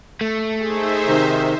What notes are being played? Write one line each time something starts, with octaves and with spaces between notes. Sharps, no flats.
A3
D#4 G#4 C5 E5
C3 D#3